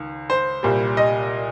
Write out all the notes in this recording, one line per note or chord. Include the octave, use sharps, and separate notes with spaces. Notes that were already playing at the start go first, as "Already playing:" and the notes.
Already playing: C#2 D#3
C5
C2 A#2 G3
D#5